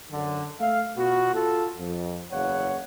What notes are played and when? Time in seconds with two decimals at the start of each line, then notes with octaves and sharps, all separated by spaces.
0.10 F#2 D3
0.59 A3 E5 F5
0.95 B2 B3 F4 F#4
1.34 F4 A4
1.78 F2
2.31 F#1 E2 C#5 F5 F#5